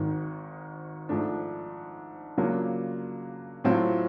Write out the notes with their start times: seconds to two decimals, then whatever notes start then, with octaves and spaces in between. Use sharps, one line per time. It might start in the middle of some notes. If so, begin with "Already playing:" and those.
Already playing: G#1 G#2 D#3
1.09 G#2 F3 A3 D4
2.37 C#3 F#3 A#3 D4 F4
3.64 A2 F#3 A3 C4 F4